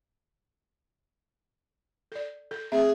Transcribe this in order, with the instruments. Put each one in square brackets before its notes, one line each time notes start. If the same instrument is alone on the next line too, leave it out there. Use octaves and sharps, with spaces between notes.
[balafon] A4 D5
A4
[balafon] A3 C4 E5 [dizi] G#4